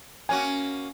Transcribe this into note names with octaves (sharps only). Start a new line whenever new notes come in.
A#3 C#4 F#4 G#5